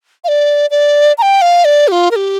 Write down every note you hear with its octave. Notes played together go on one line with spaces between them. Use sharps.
F5
D5
D5
A#5
G5
F5
D5
G4
F4
A#4
G4